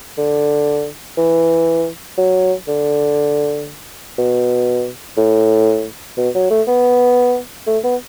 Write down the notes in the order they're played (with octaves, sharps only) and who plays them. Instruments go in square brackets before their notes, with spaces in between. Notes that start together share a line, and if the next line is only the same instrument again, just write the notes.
[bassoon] D3
E3
F#3
D3
B2
A2
B2
F#3
A3
B3
A3
B3